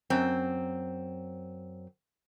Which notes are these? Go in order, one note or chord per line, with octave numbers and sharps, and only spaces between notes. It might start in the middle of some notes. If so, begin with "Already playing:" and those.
F#2 C4